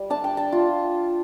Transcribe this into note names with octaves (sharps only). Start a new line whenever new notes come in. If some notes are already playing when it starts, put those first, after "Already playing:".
Already playing: G3
D4 A5
G5
A5
F4